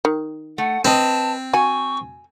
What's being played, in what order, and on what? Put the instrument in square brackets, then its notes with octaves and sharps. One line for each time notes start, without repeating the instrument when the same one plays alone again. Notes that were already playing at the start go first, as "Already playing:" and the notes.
[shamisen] D#3
[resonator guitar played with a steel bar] A3 [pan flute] F#5
[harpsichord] C4 [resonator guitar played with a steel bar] B4 D#5 [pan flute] A5
[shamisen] F#4 [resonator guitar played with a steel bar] G#5 [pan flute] C#6